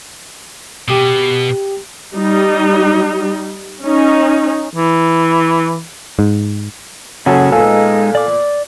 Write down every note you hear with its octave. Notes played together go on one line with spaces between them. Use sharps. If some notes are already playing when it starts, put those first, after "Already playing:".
B2 G4 D#6
G3 D#4
C#4 D#4
E3
G#2
F#1 C#3 F#3 C#4 G#4 A4 F#5
A#2 G#3 B3 D#4 A4 F5 G#5 E6
D5 D6